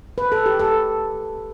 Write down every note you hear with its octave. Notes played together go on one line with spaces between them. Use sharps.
B4
A4
G4
A4